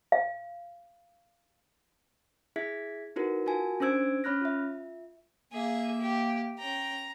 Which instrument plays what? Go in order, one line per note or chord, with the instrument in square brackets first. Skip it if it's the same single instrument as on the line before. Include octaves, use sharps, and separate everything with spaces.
[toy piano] F5
[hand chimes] E4 G#4 E5 G#6 B6
D#4 E4 F#4 A#4 B4
F4 F#4 A#4 G#5 A5
C#4 D4 C5 E6 G#6 D7
C#4 C#5 B5 F6 F#6 A#6
F4 E5
[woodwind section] A#3 [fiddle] G#4 [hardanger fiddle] E5
[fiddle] G4
[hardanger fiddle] C#4 G5 [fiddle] A#5